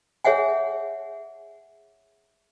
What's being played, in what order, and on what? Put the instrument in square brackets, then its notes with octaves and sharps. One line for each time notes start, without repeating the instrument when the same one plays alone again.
[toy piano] G#4 C#5 E5 F#5 G#5